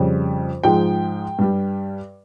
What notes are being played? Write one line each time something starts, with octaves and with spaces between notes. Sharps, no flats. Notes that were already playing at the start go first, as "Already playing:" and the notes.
Already playing: F2 C#3 G3
G#2 F3 G#3 G5
G2 G3